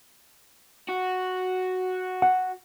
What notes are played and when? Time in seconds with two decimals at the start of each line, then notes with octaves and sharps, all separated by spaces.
0.89 F#4
2.22 F#5